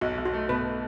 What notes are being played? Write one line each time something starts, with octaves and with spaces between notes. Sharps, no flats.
B1 F#4
B1
F#4
A3
B2 B4